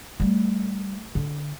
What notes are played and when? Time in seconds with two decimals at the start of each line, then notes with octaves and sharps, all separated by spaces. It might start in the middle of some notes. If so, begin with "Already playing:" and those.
0.20 G3 A3
1.15 D3